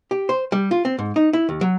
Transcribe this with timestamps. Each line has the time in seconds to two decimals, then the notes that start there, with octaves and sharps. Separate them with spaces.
0.11 G4
0.29 C5
0.52 G3
0.71 F4
0.85 C4
0.99 G#2
1.16 D#4
1.33 E4
1.49 D#2
1.61 F#3